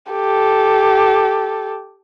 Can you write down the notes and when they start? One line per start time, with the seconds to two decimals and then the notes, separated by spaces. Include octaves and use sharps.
0.11 G4 A4